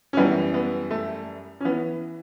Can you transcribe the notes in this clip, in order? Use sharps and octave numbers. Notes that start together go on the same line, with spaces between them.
C#4
F#2 E3 G3 B3
B3
A3
C#4
E3 B3